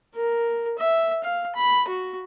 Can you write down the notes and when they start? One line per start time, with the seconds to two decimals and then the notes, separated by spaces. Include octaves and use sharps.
0.15 A#4
0.78 E5
1.23 F5
1.55 B5
1.87 F#4